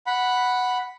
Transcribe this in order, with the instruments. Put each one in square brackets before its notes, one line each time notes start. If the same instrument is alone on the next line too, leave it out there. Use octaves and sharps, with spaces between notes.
[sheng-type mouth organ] F#5 B5